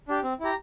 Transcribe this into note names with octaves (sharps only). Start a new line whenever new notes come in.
D4 G4
C4
E4 G4 A#5